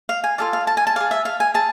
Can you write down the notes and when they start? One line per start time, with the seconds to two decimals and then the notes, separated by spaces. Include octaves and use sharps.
0.09 F5
0.24 G#5
0.38 F4 A4 D5 F5
0.53 F5
0.67 A5
0.77 G#5
0.87 A5
0.96 G#4 D5 F5
1.11 E5
1.25 F5
1.40 G#5
1.54 G#4 A5